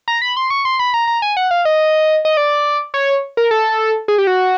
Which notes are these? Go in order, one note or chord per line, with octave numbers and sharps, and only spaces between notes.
A#5
B5
C6
C#6
C6
B5
A#5
A#5
G#5
F#5
F5
D#5
D#5
D5
C#5
A#4
A4
G#4
G4
F#4